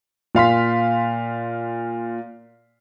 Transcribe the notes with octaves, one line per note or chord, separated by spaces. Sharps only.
A#2 F5 C6 B6